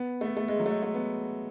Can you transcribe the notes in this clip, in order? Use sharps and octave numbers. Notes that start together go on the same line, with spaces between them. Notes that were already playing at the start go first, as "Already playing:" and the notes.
Already playing: B3
A3
B3
A3
G#3
F#3
A3
G#3
A3
B3